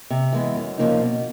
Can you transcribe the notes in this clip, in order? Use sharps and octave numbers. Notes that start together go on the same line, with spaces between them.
C3
E3 G#3 B3
F#2
C#3 F3 A#3 D#4
B2